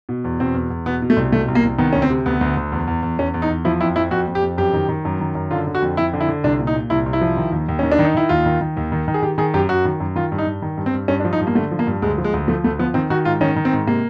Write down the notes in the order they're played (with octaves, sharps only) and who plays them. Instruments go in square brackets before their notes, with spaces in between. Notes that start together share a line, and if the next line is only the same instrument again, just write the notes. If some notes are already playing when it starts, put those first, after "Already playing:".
[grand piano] B2
E2
B2 C4
E2
E2
B2 B3
B2
A3
C2
B2 A3
C2
A#3
C2
D#3 B3
D2 C#4
C4
C3
D2 B3
D2
D2
E2
E2
E2
E2 C#4
E2
D#4
E2
F3 E4
F2 E4
F2 E4
F2 F#4
F2
G4
F2
F#2 G4
D#3
D#3
F#2
D#3
F#2
D3 F4
D3
F#4
F2
F2 E4
D3
E4
D3
C2 D4
A#2
D#4
A#2
C2 E4
C2
E4
F3
D#3
D#2
D#2
D#3 C#4
D4
D#3
D#4
D#3 E4
D#2 F4
D#3
D#3
D#2
D#3
D#3
G#4
D#3 G4
D#3 G#4
F#2 G4
F#2 F#4
D#3
F#2
D#3 F4
G2
D#4
G2
D#3
G2
C4
G2
G2 C#4
D4
F3
D#4
G2
A#3
D3 A3
F3
A#3
G2
D2 G#3
F3
G#3
D2
F3 A3
D2 A3
F3 B3
D#3 C4
D#3 F#4
G#2 F4
D#3 C#4
D#3
C4
G#2
C3 A#3